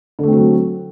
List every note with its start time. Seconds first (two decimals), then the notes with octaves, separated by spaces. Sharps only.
0.19 D3
0.23 A3
0.28 C4
0.33 F#4
0.37 F#3